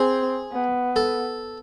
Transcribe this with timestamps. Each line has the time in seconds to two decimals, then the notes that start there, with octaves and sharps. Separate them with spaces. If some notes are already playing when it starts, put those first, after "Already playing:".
Already playing: C4 G#4
0.52 B3
0.96 A4